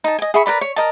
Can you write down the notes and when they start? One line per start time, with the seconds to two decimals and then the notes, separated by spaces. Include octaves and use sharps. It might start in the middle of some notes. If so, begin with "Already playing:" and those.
0.04 D#4 A5
0.19 D#5 G#5
0.34 G#4 E5 B5 C#6
0.46 A#4 B4 D5 B5
0.61 C#5
0.76 A#4 D#5 A5